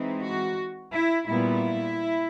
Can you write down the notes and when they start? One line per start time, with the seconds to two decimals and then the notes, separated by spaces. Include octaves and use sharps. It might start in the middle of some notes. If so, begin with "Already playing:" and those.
Already playing: E3 G#3 C4 D#4
0.22 F#4
0.93 E4
1.28 A#2 G3 B3 E4